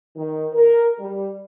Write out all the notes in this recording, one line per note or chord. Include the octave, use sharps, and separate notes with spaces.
D#3
A#4
G3